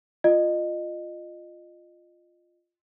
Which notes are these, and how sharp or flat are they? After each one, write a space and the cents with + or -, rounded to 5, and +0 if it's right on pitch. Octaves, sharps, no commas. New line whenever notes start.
F4 +0 D#5 -25